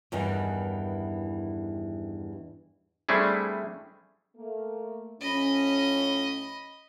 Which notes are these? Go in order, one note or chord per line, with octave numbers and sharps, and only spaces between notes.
E2 G2 D#3 E3
G3 A3 C4 D4 E4 G#4
A3 A#3
A2 F3 C#4 D#5 B5